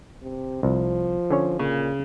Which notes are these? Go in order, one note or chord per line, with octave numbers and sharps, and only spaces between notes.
C3
C2 F3
D3 C#4 C#5
A#2 C#3